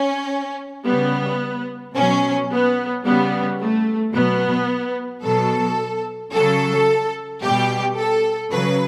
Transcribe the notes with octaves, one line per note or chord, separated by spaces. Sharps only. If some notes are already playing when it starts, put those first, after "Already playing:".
Already playing: C#4
C#3 G3 B3
B2 F#3 C#4
B3
C#3 G3 B3
A3
B2 F#3 B3
B2 F#3 A4
C#3 F#3 A4
B2 G3 G4
A4
C#3 F#3 B4